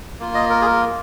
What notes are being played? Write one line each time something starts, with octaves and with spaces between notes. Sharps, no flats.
A#3 F4
D#5
A#4
G#4
A#4